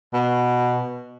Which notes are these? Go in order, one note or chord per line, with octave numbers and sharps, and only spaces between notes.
B2